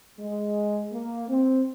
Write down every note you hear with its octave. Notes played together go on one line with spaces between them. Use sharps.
G#3
A#3
C4